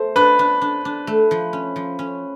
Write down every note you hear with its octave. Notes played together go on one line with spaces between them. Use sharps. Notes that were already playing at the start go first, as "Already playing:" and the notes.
Already playing: A3 C5
D4 B4
D4
D4
D4
A3
F3
C#4
F3
C#4